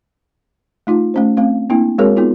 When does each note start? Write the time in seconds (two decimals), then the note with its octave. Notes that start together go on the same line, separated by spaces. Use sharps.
0.87 A3 D#4 F4
1.14 A3 C#4 C5
1.37 A3 C4 F5
1.70 A#3 C4 D4 E4
1.98 G#3 C4 F#4 G#4 A#4 C#5
2.16 B3 D#4 F4 G#4